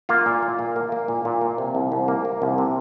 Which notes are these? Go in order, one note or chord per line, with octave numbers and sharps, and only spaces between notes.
A#3 F4 F5
A#2
A#3
A#2
A#3
A#3
A#2
A#2
A#3
C3
C2
C2
A#3
A#3
C2
C3